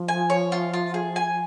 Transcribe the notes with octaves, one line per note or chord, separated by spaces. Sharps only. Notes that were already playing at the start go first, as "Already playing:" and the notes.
Already playing: F3
G#5
C#5
F4
F4
G#4
G#5